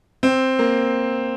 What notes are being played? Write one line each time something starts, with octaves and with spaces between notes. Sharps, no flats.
C4
A#3